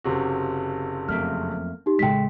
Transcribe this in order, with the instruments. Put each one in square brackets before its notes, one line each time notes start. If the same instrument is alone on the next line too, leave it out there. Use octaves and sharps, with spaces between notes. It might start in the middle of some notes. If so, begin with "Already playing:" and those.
[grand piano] F#1 C3 F#4
[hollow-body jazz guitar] F2 A3 A#3 [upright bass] F#3 [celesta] F6
[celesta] D#4 G4
[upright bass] A1 C#3 [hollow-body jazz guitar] G#3 A4 [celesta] G5 B6